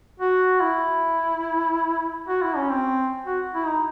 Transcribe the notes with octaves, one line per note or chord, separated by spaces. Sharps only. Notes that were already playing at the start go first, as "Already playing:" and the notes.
F#4
E4
F#4
E4
C#4
C4
F#4
E4
D#4